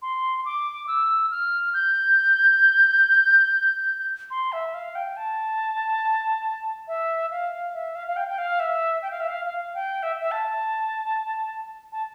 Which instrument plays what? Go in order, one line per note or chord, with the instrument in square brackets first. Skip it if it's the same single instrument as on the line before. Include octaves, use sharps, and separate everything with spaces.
[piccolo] C6
D6
E6
F6
G6
C6
E5
F5
G5
A5
E5
F5
E5
F5
F5
G5
G5
F5
E5
G5
F5
E5
F5
F5
G5
E5
E5
A5
A5